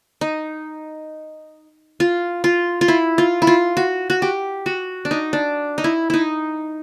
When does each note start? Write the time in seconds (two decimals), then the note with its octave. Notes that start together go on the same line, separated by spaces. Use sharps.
0.21 D#4
2.00 F4
2.44 F4
2.81 F4
2.88 E4
3.18 F4
3.42 E4
3.47 F4
3.77 F#4
4.10 F#4
4.22 G4
4.66 F#4
5.05 D4
5.11 D#4
5.33 D4
5.78 D#4
5.84 E4
6.10 D#4 E4